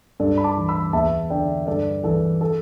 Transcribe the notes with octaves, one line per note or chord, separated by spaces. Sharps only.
G2 A4 D5
B5
A5 D6
E3
B5 E6
E2 E5 A5
D3 D5 G5
G2 A4 D5
E3 A4
A4